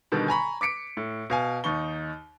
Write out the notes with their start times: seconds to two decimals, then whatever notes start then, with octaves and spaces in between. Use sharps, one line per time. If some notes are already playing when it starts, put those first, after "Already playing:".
0.12 B2 D3 D#3 G3
0.28 G#5 A#5 B5 C#6
0.61 D6 B6 C#7 D7
0.97 A2
1.30 B2 F5 G#5
1.64 D#2 D#4 C#6 G7